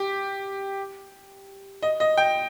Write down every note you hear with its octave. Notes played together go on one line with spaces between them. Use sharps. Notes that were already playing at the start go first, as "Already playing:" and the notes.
Already playing: G4
D#5
D#5
G5